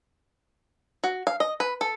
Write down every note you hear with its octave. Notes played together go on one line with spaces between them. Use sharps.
F#4
F5
D#5
B4
A4